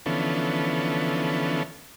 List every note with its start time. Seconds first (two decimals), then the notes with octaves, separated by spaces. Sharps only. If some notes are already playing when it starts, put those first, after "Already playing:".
0.06 D3 E3 F3 B3 C#4 A4